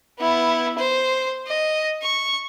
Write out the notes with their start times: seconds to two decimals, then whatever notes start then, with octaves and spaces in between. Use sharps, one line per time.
0.19 B3 E4
0.78 C5
1.47 D#5
2.02 C#6